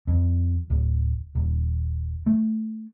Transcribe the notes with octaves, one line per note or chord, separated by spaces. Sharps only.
F2
D1
D#1
A3